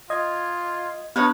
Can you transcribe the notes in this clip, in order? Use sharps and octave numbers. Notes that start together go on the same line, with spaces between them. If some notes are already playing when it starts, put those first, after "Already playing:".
F4 D#5 G#6
B3 D4 B4 C#5 D#5